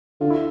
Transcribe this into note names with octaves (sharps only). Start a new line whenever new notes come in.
D3 F4
E4